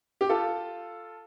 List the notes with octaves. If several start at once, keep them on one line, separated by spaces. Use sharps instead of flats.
G4
F4 A4